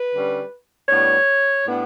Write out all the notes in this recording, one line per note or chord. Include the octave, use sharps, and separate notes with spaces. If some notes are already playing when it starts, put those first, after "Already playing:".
Already playing: B4
D3 G3 C#4
A2 G3 B3 D4 C#5
A2 G3 B3 D4